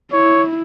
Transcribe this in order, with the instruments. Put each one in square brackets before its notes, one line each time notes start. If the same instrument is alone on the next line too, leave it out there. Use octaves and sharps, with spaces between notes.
[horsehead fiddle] E4 [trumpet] C#5